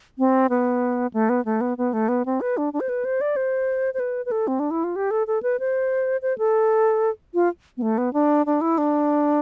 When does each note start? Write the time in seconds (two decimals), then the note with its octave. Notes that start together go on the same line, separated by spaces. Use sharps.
0.18 C4
0.50 B3
1.14 A3
1.29 B3
1.45 A3
1.61 B3
1.78 B3
1.93 A3
2.09 B3
2.26 C4
2.41 B4
2.57 D4
2.73 D4
2.80 C5
2.89 B4
3.05 C5
3.21 D5
3.36 C5
3.94 C5
4.00 B4
4.26 B4
4.31 A4
4.48 C4
4.60 D4
4.71 E4
4.84 F4
4.96 G4
5.11 A4
5.27 A4
5.43 B4
5.60 C5
6.22 C5
6.38 A4
7.34 F4
7.77 B3
7.82 A3
7.98 B3
8.13 D4
8.46 D4
8.61 E4
8.78 D4